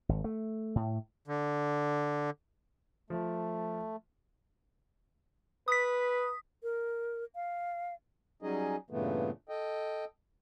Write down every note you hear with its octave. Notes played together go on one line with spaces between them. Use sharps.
G#1
A3
A2
D3
F3 A3
B4 D#6 B6
A#4
F5
F#3 G3 C#4 D#4 G#4 D#5
G2 A#2 C#3 E3 A3 B3
A4 D#5 G5